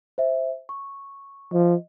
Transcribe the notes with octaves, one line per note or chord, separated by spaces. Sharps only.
C5 E5
C#6
F3 D#5